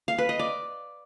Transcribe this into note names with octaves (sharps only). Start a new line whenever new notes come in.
F5
B4
D#5
D5